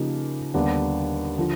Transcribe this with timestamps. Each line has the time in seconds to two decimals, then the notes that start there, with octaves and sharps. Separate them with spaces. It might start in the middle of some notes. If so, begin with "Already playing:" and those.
Already playing: C#3 F3 A#3 D#4 G4
0.54 D#2 D3 G3 B3 D4
1.38 D3 F3